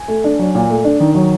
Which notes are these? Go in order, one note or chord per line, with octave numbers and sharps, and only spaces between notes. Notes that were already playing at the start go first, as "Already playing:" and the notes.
Already playing: G#5
A3
D4
F#3
A#2
A3
D4
D#3
F#3